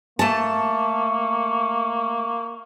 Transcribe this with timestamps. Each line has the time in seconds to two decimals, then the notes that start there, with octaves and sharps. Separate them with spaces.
0.19 A3 A#3 A5 C#6